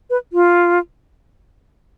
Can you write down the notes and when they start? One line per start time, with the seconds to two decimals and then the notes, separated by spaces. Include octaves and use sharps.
0.10 B4
0.33 F4